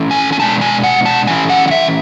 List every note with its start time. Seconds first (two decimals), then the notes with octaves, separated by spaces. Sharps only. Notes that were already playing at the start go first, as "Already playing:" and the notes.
Already playing: E3 A3 C#4 E4
0.11 G#5
0.33 G#5
0.40 B2 G#3 B3 D4 A5
0.61 G#5
0.83 F#5
1.06 A5
1.27 E3 A3 C#4 E4 G#5
1.49 F#5
1.68 F#5
1.71 E5